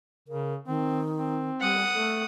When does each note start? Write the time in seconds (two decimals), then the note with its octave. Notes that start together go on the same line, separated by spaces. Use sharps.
0.28 C#3 A#4
0.67 D#3 C4
1.15 C4
1.62 G3 F#5 D#6
1.95 A3 A4